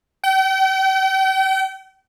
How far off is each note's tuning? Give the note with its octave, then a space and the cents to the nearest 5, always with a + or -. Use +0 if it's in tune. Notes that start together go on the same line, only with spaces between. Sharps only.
G5 -40